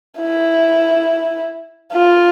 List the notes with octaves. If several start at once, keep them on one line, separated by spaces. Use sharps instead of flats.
E4
F4